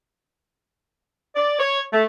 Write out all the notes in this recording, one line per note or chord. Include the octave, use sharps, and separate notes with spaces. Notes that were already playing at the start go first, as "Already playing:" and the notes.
D5
C#5
A3